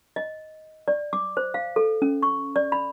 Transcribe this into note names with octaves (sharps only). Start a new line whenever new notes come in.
D#5
D5
D6
C5
F5
A4
C#4
C#6
D5
B5